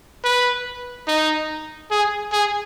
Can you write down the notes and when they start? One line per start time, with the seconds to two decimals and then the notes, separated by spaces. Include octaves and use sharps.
0.24 B4
1.08 D#4
1.91 G#4
2.33 G#4